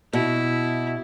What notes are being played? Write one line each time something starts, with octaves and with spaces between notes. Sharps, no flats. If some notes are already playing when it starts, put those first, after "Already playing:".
B2 E4